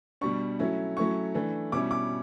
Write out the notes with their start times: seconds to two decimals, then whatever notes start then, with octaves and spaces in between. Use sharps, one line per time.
0.21 B2 G3 D4 C#6
0.59 F#3 A3 C#4 E4
0.97 F#3 A3 C#4 E4 C#6
1.35 E3 A3 D4
1.72 B2 G3 C#4 E4 D6
1.91 D6